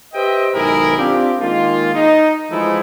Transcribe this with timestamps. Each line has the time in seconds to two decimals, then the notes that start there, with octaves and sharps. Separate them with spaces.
0.14 G4 B4 C5 D#5 E5 G5
0.54 B1 G#2 D#3 E4 G#4 A#4
0.97 C4 D4 F4 G4
1.40 D#3 G#3 A#3 F4
1.94 D#4
2.51 E3 F3 G#3 A3 D#4 E4